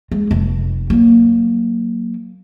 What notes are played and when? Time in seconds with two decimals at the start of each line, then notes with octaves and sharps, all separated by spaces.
0.12 G#3
0.31 F1
0.90 F#3 A#3